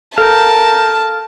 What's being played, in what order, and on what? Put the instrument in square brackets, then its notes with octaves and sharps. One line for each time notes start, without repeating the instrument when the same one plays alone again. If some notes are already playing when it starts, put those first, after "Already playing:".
[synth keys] A4 [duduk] A#4 [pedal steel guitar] F5 G5 [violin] A5